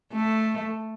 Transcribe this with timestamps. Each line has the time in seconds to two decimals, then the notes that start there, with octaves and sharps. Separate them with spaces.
0.13 A3